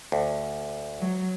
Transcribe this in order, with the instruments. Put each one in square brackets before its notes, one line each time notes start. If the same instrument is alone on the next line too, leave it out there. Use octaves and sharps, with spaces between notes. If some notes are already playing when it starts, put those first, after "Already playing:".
[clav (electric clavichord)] D2
[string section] F#3